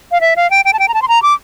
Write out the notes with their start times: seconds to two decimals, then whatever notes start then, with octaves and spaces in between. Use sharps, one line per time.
0.12 F5
0.21 E5
0.36 F5
0.51 G5
0.65 G5
0.73 A5
0.79 G5
0.88 A#5
0.94 A5
1.02 C6
1.08 A#5
1.23 D6